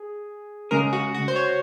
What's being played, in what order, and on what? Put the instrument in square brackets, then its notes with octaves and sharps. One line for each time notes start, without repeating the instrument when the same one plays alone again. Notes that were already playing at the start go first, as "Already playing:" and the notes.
Already playing: [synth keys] G#4
[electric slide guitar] C#3 G#3 C#4 G#4 [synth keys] A#4
[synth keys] F#4
F#4
C5
C#5